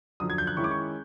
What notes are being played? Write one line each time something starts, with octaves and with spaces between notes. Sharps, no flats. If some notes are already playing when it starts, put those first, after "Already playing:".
F#2 D3 F3 D#6
G#6
G6
F#6
D#3 G#3 C#4 E4 C#6
D6
C#6